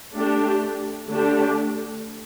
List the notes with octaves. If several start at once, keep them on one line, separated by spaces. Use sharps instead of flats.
A3 D4 G4
D3 A3 D4 G4